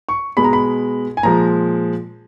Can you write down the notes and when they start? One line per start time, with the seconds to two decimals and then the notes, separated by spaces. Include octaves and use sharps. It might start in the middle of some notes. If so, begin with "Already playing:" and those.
0.09 C#6
0.37 B2 G#3 B5
0.44 A#5
0.53 B5
1.17 G#5
1.23 A#2 F3 G#3 A#5